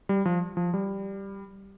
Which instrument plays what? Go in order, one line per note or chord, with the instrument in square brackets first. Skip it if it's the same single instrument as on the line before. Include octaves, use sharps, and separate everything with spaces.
[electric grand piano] G3
F3
F3
G3